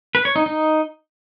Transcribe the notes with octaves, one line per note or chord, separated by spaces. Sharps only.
B4
C#5
D#4
D#4